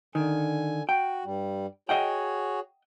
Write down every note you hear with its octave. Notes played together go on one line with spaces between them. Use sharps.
D3 D#3 G#5
F#4 G5
G2 G3
F#4 G#4 C#5 D#5 F#5 G5